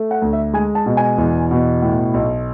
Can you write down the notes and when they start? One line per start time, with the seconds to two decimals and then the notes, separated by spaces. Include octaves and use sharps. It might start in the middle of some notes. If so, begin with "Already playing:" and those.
Already playing: A3
0.11 F#5
0.22 D2
0.33 E5
0.53 G#3 G#5
0.75 A5
0.86 B2
0.97 G#5
1.18 E2
1.51 B2
1.82 A2
2.14 B1